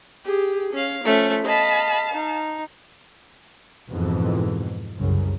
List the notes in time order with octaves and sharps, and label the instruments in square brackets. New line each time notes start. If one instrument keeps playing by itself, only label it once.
[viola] G4 G#4
C#4 F5
[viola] F3 [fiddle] A3 C#4
[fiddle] D#5 B5 [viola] F5 A5
[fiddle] D#4
[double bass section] F2 G#2 B2 E3
C2 F#2 C#3